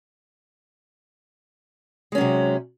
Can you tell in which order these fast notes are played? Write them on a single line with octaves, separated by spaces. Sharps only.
G#3 C#4 F#3 C3